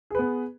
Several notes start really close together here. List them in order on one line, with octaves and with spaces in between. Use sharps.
G#4 B4 B3